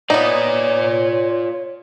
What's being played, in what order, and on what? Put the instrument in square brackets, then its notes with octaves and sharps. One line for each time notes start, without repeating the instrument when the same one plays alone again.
[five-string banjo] B3 D#4 [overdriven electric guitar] F4 D5 [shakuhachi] C#5